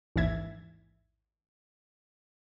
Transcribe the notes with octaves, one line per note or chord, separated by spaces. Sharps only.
A1 D#2 G#2 E3 E5 G#6